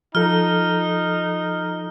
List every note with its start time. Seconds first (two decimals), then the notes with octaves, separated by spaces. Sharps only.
0.15 F3 D#4 F4 A4 F6